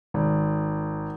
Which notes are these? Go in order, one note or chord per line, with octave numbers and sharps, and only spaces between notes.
G#1